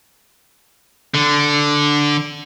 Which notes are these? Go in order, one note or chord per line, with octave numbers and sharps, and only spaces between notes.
D3